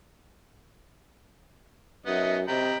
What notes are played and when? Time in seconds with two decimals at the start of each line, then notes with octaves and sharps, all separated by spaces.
2.06 F#2 B3 D#4 D#5 E5
2.48 C3 D#5 G5 A#5 B5